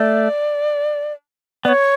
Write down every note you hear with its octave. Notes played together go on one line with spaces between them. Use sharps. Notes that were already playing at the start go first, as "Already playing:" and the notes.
Already playing: A3 D5
B3 D5
C#5